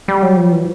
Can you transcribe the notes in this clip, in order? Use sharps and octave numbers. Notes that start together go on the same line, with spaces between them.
G3
F#3
F3
E3